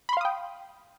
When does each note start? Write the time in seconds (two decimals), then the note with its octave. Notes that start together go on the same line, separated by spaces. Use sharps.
0.09 B5
0.13 C6
0.17 F5
0.21 D#6
0.25 G5